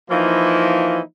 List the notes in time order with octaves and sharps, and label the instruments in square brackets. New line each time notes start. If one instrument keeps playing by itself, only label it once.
[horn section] E3 F3 A#3 D#4 E4